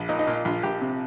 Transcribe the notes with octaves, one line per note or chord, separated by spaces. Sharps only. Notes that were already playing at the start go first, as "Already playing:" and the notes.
Already playing: A#1
A#2 D#4
D#4
A#2 F4
A#1 F4
A#1 G4
C3